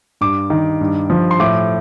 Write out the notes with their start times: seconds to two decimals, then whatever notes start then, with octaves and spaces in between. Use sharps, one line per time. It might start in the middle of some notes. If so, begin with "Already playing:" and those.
0.21 G2 D6
0.50 D#3
0.81 G2
1.10 F3
1.31 C6
1.40 A2 D6